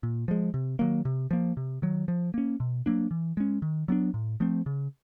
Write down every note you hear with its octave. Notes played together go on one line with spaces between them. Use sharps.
A#2
F3 G#3
C3
D#3 F#3 A#3
C3
F3 A#3
C3
D#3 F#3
F3
A#3 C#4
B2
F#3 A#3 D4
E3
G#3 C#4
D#3
F#3 B3 D4
A2
F3 A3 C4
C#3